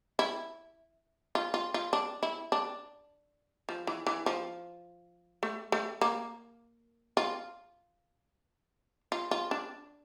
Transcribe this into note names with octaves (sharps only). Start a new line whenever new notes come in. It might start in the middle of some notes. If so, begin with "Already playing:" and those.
E4
F4
F4
F4
D4
E4
D4
F3
E3
E3
F3
A3
A3
A#3
F4
F4
F4
D4